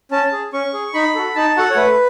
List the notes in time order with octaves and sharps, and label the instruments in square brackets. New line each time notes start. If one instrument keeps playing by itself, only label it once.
[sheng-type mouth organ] C#4 A5
G#4
C#4 C#6
G#4
D#4 B5
F#4 A4
D#4 A5
F#4 A4 F#5
C#5
A3 B4